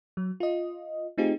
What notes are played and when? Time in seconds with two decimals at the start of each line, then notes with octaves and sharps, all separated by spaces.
0.17 F#3
0.40 F4 D#5
1.18 A3 C4 D#4 F4 G4 G#4